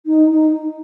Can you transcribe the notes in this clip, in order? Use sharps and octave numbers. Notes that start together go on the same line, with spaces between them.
D#4
D#4